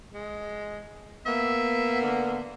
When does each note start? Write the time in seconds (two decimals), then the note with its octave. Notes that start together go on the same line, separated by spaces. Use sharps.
0.14 G#3
1.26 A#3 B3 E5
2.01 D3